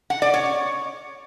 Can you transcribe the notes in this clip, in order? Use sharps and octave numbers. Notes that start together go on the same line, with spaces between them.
F#5
D5
C#5